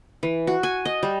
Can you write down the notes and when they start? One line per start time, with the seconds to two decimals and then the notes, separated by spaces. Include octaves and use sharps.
0.23 E3
0.47 F#4
0.63 G#5
0.85 D#5
1.03 G3